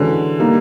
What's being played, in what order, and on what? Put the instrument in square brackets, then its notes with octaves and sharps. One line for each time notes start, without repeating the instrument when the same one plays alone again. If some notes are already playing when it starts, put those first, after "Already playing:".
Already playing: [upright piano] D3 [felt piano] E3 G#3 C#4 F#4
[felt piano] G3 A#3 D#4